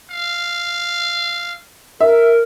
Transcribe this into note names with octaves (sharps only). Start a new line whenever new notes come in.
F5
A#4 E5